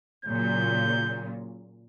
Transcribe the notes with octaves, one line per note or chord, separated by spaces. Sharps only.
A#2 C#3 F#3 G6